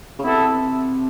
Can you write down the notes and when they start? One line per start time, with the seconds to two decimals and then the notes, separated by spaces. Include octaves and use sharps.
0.19 C#3
0.23 C3 B3 E4 A4